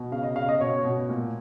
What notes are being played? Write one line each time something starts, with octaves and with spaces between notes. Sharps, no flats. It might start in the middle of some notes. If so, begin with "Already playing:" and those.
Already playing: B2
C#3 F5
D#5
C#3 F5
D#5
B2 C#5
B2
A#2